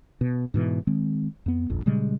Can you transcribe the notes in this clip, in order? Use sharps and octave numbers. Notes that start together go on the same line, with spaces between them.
B2
G#2 B2 E3
D#3 G#3 C4
F2 B3
D#1 A#1 F2
A#2 C#3 G3 G#3